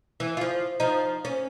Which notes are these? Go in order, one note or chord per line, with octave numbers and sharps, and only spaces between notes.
E3
F3 F4
F3 D#4
C#4